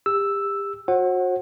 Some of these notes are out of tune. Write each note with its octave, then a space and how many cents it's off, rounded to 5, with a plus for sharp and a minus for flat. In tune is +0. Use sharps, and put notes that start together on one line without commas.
G4 +35 E6 +0
F#4 -30 C5 +45 F#5 +0